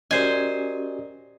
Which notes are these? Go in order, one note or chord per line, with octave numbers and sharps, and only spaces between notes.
C#4 F#4 G4 A#4 C5 D5 D#5 G#5